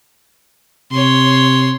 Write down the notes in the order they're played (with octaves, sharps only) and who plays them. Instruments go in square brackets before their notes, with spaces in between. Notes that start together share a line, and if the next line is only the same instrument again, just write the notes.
[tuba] C3 [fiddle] C#5 C6